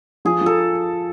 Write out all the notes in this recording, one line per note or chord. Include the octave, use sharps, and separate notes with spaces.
F3 G#4
F3 A4